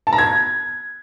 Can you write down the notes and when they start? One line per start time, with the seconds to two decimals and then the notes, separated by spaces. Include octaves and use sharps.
0.07 A5
0.13 A#5
0.18 G#6